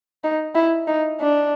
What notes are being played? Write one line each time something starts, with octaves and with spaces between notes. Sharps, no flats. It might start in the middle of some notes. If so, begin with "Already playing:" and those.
D#4
E4
D#4
D4